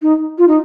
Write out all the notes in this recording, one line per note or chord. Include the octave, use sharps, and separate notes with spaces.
D#4
F4
D#4